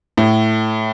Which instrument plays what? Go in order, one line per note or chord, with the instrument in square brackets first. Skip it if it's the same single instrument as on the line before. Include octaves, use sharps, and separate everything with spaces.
[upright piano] A2